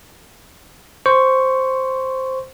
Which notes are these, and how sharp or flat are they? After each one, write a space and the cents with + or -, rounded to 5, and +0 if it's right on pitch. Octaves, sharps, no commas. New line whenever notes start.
C5 +0 C#6 +5